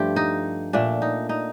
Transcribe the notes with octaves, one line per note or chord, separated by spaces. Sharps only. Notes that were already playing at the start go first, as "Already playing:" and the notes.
Already playing: G2 F3 A3 F4 G4
D#4
A#2 A3 D4
D#4
D#4